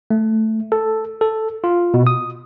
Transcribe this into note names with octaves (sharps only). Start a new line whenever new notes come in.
A3
A4
A4
F4
B2
D#6